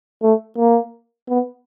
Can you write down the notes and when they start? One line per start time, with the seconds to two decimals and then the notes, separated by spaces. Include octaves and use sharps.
0.23 A3
0.58 A#3
1.29 B3